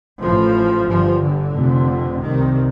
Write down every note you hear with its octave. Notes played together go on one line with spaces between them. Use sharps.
A1 A2 F3
G1 G2 F3
D3
F1 F2 C3
C2 C3 D#3